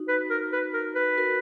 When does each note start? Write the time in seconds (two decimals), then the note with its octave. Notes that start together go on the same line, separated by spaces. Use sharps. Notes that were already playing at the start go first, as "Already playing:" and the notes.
Already playing: D#4 F#4
0.08 B4
0.18 D#4 F#4
0.30 A#4
0.52 B4
0.74 A#4
0.95 B4
1.17 F#4 A#4